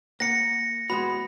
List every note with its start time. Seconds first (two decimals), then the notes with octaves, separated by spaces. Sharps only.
0.20 A#3 F#5 A#6 C#7
0.90 G#3 B3 F#4 B5